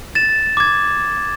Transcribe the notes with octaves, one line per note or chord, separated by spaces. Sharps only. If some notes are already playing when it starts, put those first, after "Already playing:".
A6 E7
D6 G#6